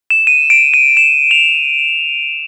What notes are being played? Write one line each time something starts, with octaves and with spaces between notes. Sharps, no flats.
E7
D#7
D7
D#7
E7
F7